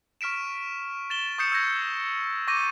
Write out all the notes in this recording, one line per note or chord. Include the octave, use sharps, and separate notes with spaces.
C#6 F6 B6 D7 E7
A6 E7 G7
C#6 D#6 G6 C7 C#7 E7
E6 G#6 A#6 C#7
C#6 D6 G6 A6 A#6 D#7